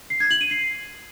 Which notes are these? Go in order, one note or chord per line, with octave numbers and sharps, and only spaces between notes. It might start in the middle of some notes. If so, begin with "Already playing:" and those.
C7
G#6
F#7
D#7
C7